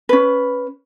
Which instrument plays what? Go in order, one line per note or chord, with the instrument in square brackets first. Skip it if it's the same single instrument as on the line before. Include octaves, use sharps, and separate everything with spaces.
[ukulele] C#4 B4